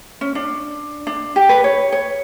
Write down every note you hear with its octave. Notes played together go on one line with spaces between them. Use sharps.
C#4
D4
D4
G4
B4
C#5
C#5